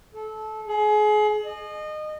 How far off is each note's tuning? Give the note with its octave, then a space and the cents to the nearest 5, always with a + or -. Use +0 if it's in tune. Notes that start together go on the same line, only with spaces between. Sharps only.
A4 -20
G#4 +30
D#5 -25